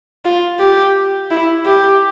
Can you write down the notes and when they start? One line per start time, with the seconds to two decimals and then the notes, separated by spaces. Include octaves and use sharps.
0.25 F4
0.60 G4
1.31 E4
1.66 G4